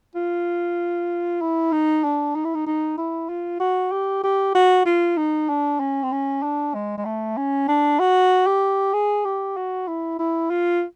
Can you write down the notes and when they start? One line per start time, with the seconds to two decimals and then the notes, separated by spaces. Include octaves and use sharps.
0.16 F4
1.41 E4
1.72 D#4
2.04 D4
2.35 D#4
2.45 E4
2.55 D#4
2.67 D#4
2.97 E4
3.29 F4
3.60 F#4
3.92 G4
4.24 G4
4.55 F#4
4.86 F4
5.17 D#4
5.49 D4
5.80 C#4
6.03 C4
6.12 C#4
6.43 D4
6.75 G#3
6.98 G#3
7.05 A3
7.37 C#4
7.68 D4
8.00 F#4
8.47 G4
8.93 G#4
9.25 G4
9.57 F#4
9.88 E4
10.19 E4
10.50 F4